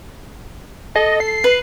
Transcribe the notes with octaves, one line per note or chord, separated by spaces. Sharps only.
A4 D#5
C7
B4